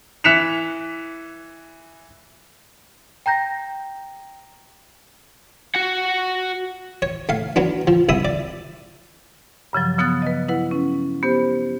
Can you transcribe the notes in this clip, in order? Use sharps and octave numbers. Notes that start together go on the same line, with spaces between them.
E3 F#6 B6 C#7 E7 F7
G5 A#5 G6 A#6
F#4 F#5
C#5
A3 F5
F#3 B3 D4
F3
C2 E4 E5 D#6
D5
G2 C#3 F3 F#3
C#3 F3 B3 D#6 F#6 A6
B4 D#5
E4 B4 F#5
C#4
B3 G4 C5